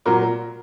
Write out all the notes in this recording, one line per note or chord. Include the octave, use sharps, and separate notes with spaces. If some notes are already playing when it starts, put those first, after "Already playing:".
A#2 F#3 A#4